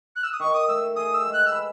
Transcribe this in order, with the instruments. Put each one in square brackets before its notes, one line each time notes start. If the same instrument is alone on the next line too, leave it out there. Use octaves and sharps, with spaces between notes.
[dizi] F#6
E6
D#6
[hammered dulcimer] D#3 [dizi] C#6
[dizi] D#6
[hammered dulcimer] A3 [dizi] E6
[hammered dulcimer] G#4 [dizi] D#6
[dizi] E6
[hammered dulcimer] G#3
[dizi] F#6
E6
[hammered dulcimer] B4